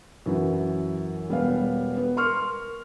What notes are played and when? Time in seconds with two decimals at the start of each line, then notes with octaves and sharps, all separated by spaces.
0.26 F#2 E3 F#3
1.28 E1 G3 B3 F5
1.97 B3
2.17 A#4 C6 C#6 F6